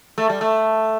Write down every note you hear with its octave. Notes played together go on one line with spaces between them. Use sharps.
A3
G3
A3